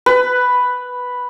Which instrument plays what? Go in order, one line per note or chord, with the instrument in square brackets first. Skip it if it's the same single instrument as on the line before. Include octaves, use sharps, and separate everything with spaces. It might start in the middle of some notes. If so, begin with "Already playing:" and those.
[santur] B4